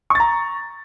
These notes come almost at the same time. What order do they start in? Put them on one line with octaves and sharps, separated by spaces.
C#6 A6 A#5